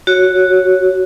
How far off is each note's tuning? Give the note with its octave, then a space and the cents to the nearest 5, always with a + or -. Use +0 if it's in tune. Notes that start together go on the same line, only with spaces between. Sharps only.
F#4 +0 C#5 +0